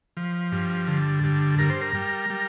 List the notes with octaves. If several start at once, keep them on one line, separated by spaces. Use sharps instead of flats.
F3
G2
D3
G2
G2 A#4
C5
A#4
G3
G3